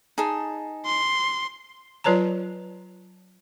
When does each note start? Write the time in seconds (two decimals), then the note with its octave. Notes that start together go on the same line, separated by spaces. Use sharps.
0.18 D#4 G#4 A5
0.86 C6
2.04 F#3 F4 B4 C#5 A5 A#5